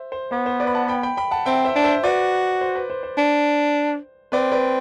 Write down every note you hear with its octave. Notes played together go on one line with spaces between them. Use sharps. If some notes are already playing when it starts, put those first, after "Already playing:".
Already playing: C5 E5
C5
B3 C5
C5
B4 D5
B5
F#5 A5
G5 B5
G5 B5
G5 B5
F#5 A5
C4 E5 G5
C5 E5
D4
C5 E5
F#4 B4 D5
C5
B4
C5
C5
D4
C4 B4 D5
B4 D5